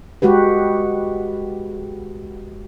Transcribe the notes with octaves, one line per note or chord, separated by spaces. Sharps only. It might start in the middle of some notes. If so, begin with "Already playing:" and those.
G#3 F#4 G4 B4